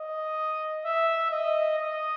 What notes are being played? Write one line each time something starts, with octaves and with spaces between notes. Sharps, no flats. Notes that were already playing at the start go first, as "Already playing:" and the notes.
Already playing: D#5
E5
D#5
D#5